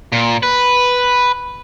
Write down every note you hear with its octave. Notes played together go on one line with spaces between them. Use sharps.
A#2
B4